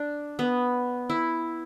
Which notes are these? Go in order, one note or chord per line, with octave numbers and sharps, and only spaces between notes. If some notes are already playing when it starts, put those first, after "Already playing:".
Already playing: D4
B3
E4